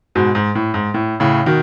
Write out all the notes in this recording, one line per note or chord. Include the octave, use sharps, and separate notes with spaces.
G#2 B2
G#2
A2
G#2
A2
A2 C#3
B2 D#3